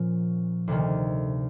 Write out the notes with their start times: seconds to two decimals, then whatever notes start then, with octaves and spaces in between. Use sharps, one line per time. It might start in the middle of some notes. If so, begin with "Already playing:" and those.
Already playing: A#2 F3 A#3 C#4
0.68 D2 C3 D#3